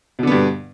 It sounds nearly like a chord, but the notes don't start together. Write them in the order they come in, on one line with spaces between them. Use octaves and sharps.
B2 D3 B3 G2